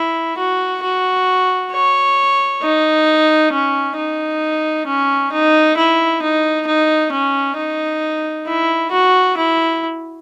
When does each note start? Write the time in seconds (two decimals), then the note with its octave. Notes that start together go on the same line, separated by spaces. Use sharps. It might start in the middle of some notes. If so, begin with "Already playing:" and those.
Already playing: E4
0.38 F#4
0.83 F#4
1.72 C#5
2.62 D#4
3.53 C#4
3.97 D#4
4.87 C#4
5.32 D#4
5.77 E4
6.23 D#4
6.67 D#4
7.12 C#4
7.57 D#4
8.47 E4
8.91 F#4
9.37 E4